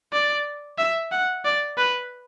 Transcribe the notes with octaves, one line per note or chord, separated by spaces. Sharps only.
D5
E5
F#5
D5
B4